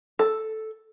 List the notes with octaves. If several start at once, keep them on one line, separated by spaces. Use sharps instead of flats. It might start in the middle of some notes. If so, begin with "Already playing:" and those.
A4